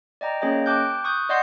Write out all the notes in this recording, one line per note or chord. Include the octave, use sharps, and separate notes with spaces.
D5 D#5 G5 A#5
A#3 C#4 G#4 C#5 D#5 G5
G5 A5 D6 F#6 G6
C#6 D#6 F#6 G6
D5 D#5 F#5 C6 G6 C7